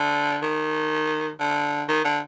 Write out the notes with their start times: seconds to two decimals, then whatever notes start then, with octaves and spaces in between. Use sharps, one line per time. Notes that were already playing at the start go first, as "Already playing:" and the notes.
Already playing: D3
0.43 D#3
1.40 D3
1.89 D#3
2.05 D3